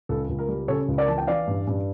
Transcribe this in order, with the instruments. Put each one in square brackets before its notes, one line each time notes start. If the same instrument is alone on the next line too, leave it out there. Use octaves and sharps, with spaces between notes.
[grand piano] C#2 A4
C#2
A#4
G3
C#3 A4 C#5
C#2
A#4 D5
E3 A5
G5
E3 D5 F5
G2
G2